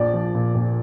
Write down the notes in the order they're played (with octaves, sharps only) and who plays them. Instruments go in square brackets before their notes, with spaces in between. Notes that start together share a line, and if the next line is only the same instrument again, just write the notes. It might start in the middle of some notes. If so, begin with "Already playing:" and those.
Already playing: [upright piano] A#1 D5
F3
A#2
A#1